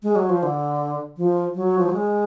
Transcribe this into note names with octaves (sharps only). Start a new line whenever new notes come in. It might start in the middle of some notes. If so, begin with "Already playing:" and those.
G#3
F#3
F3
D3
F3
F#3
F3
F#3
G#3